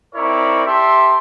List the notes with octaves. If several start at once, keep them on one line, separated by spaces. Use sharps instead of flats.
C4 D#4 E4 A#4 C#5 D5
G4 A4 E5 C6